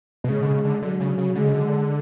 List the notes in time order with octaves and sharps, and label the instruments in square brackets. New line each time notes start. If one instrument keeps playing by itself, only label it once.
[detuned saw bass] B2
[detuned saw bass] C#3 [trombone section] G#3
[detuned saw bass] D3
C#3
D3
[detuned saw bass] D3 [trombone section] F#3
[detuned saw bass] C#3
C#3
[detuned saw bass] D3 [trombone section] G#3
[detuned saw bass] C#3
D3